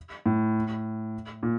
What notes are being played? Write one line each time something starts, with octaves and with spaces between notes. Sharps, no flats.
A2
A#2